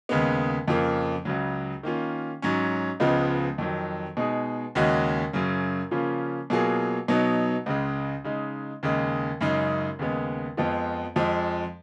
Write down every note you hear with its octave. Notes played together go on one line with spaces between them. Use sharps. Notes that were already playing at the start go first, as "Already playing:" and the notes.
D#2 C#3 G#3 B3
F2 C#3 F3 A#3
C#2 C#3 F#3
D#3 A#3 C#4 F4
G#2 F#3 C#4
C#2 C#3 F3 G#3 B3
F2 D#3 F#3
B2 G#3 D#4 G#4
D#2 C#3 G#3 C#4 F#4
F#2 C#3 F#3
C#3 F3 A#3 C#4 F4
B2 F#3 A#3 F4 G#4
B2 F#3 B3 D#4
C#2 C#3 G#3
C#3 G#3 D#4
D#2 C#3 G#3
F#2 C#3 G#3 D#4
D#2 C#3 G#3 B3
F2 F3 G#3 B3 F4
F2 F3 G#3